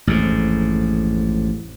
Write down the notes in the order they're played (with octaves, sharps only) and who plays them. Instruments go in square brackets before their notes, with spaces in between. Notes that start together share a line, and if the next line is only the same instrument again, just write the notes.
[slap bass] A1 F2 G#2